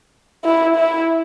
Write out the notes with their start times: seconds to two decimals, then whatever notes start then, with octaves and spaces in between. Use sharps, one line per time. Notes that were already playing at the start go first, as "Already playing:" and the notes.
0.45 E4
0.76 E4